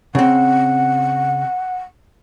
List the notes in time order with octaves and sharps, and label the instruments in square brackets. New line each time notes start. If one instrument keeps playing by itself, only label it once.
[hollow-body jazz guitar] C#3 C4 [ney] F#5